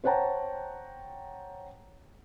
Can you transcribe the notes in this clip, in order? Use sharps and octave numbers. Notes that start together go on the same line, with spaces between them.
C5 C#5 F#5 G5 A5 A#5